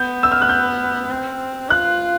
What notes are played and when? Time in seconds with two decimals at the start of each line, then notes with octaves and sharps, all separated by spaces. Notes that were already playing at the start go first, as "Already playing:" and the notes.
Already playing: B3 G6
0.23 E6
0.32 F6
0.42 F#6
0.49 G6
1.10 C4
1.70 F4 F#6